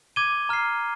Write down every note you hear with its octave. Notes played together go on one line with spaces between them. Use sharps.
D6 G#6 D#7 G7
A#5 F6 C7